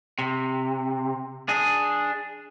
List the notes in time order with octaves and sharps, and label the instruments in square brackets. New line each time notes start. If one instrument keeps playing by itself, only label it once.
[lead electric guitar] C3
D4 G#4